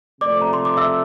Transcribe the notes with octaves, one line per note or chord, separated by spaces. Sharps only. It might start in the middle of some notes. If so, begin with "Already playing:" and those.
C3 F3 A3 C4 D5 D6
A#5
C6
D6
E5 E6